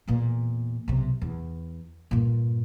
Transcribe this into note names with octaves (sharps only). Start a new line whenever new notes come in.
E2 A#2
B1 C3
E2
G2 A#2